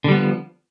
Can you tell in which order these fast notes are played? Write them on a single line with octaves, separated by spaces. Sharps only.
D3 G3 B3 F3